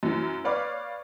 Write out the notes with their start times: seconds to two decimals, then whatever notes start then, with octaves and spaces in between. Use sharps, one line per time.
0.03 F#2 E3 F#3
0.44 B4 C#5 D5 F5 B5 D6